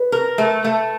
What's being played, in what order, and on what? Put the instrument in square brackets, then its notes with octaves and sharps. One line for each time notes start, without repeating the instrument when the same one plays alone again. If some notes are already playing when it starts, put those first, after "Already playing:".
Already playing: [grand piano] B4
[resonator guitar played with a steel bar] A#4
A3
A3